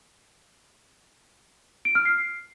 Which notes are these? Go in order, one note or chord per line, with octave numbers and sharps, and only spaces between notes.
D7
F6
C7